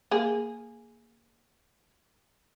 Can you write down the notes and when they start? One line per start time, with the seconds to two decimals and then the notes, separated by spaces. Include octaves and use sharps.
0.11 A#3 G#4